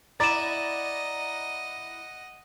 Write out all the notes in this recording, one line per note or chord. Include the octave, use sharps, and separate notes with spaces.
E4 D5 D#5 F#5 A#5 A6 E7